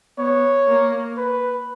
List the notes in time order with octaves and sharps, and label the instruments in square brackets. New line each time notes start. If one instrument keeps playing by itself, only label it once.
[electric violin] B3 [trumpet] C#5
[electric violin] A#3
[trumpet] B4